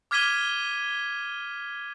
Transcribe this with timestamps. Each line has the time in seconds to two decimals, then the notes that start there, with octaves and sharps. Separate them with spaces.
0.11 D6 F6 G#6 B6 D#7 G7